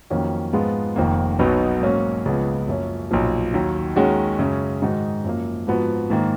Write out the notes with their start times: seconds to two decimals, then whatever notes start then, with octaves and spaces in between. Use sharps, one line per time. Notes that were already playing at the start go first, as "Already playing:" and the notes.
0.10 F2 D#3 F#3 A#3 C#4
0.53 G#2 F3 G#3 B3 F4
0.96 F1 F2 D#3 A#3
1.39 B1 B2 F#3 B3 D#4
1.82 G#2 F#3 A#3 C#4 F#4
2.25 C#2 C#3 F3 B3
2.68 F#2 F3 A#3 C#4
3.11 B1 A#2 F3
3.54 D#2 D#3 F#3
3.96 D#2 D#3 G#3 C#4 F#4
4.38 F#2 C#3 G#3 C#4
4.82 G#2 D#3 G#3 D#4 F#4
5.24 F#2 F3 A#3
5.67 G#2 F3 B3 F#4
6.10 G#2 D#3 A#3